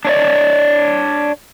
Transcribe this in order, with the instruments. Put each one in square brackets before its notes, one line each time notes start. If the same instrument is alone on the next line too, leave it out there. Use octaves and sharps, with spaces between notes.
[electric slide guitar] D4 C#5 D5